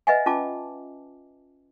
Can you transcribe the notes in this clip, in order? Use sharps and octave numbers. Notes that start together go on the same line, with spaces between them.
B4 D#5 E5 F#5 G#5
C#4 F4 A5 D6